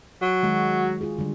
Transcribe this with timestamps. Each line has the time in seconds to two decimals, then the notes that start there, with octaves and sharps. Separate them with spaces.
0.22 F#3
0.43 D#3 G#3 F#4
1.01 F4 G#4
1.18 D3 G3